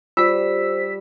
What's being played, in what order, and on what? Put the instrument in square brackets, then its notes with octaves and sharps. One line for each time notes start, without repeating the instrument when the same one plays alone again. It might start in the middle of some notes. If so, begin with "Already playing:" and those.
[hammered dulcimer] G3 [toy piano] F4 [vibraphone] C5 [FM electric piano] E6 B6